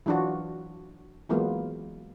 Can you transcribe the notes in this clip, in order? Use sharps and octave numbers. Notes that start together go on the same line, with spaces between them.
E3 F#3 D4 F4 F#4
E3 F#3 G#3 A#3 B3 F4